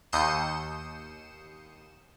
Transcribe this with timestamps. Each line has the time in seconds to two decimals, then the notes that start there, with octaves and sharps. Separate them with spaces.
0.13 D#2 D#6 G6 C7 C#7 E7